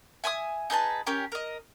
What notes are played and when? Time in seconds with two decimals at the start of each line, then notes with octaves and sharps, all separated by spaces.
0.24 E5 G#5 B5 D#6
0.70 D#4 G#4 B4 A5
1.06 C#4 G4 A#4
1.32 A#4 D#5